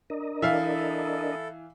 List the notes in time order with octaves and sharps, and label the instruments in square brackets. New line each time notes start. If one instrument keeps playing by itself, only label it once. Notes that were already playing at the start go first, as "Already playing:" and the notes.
[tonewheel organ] D4 A#4 D#5
[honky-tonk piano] E3 [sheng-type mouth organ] E4 A4 [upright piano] E5 F5